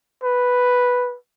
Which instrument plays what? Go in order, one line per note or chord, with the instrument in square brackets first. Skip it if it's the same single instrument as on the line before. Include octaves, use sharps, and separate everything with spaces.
[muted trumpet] B4